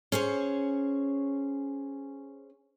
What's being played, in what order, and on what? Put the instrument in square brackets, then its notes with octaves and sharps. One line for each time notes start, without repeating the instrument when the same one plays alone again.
[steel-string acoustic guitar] C#4 G#4 C5 C#5